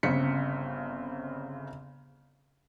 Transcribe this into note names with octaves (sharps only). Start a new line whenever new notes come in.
G1 C#3 C4 B6 C#7